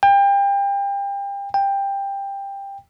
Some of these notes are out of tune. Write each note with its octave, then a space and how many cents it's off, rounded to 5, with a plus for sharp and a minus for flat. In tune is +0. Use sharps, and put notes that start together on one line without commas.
G5 +30
G5 +15